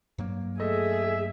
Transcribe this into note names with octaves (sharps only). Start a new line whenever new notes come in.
G2 F#3 A#3
A3 G#4 D#5 E5